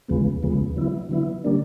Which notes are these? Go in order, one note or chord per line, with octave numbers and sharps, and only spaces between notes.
D#2 C#3 F3 G#3 B3
D#2 C#3 F3 G#3 B3
D3 F#3 B3 E4
D3 F#3 B3 E4
D3 G3 A#3 D4